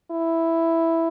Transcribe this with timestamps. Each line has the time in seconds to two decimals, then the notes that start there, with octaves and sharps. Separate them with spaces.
0.11 E4